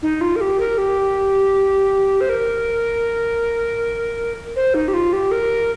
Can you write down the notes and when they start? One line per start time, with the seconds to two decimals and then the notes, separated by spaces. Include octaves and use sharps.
0.02 D#4
0.21 F4
0.36 A#4
0.41 G4
0.60 A#4
0.78 G4
2.21 C5
2.29 A#4
4.56 C5
4.74 D#4
4.88 G4
4.94 F4
5.13 G4
5.31 A#4